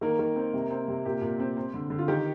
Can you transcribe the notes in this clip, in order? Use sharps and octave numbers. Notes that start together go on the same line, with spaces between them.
D#3 A#3 A#4
D#3
C4
C3
C4
C3
A#2 G4
A#2
C4
C4
D3
D3
F4
D#3 G4